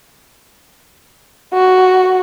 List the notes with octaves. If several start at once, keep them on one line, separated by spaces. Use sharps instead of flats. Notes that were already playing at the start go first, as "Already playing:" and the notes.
F#4